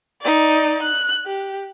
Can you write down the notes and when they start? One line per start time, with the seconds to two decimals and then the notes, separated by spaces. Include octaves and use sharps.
0.22 D#4 D5
0.83 F#6
1.26 G4